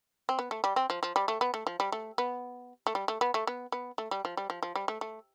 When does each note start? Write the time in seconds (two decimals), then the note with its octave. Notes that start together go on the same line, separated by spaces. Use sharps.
0.29 C4
0.39 B3
0.51 A3
0.64 G3
0.76 C4
0.90 F3
1.03 F3
1.16 G3
1.28 A3
1.41 B3
1.54 A3
1.67 F3
1.80 G3
1.92 A3
2.18 B3
2.87 A3
2.95 G3
3.08 A3
3.21 B3
3.34 A3
3.47 B3
3.72 B3
3.98 A3
4.11 G3
4.25 F3
4.37 G3
4.50 F3
4.63 F3
4.76 G3
4.88 A3
5.01 A3